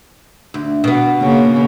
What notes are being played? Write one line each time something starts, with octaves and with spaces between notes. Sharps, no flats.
D2
B2 B3
C#3 A#3